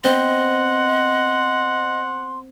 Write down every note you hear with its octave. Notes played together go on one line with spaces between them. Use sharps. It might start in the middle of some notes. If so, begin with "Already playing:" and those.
B3 C4 C5 D#5 F#5 C6